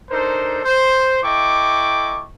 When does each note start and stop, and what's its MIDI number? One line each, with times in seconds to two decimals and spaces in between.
0.10 0.61 62
0.10 0.61 63
0.10 0.61 69
0.10 0.61 70
0.10 0.61 72
0.64 1.21 72
1.23 2.26 64
1.23 2.26 69
1.23 2.26 75
1.23 2.26 79
1.23 2.26 85
1.23 2.26 86